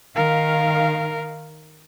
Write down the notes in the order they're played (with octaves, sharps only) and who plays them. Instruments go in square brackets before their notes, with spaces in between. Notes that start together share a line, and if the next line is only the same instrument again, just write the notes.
[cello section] D#3 F5 [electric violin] A#4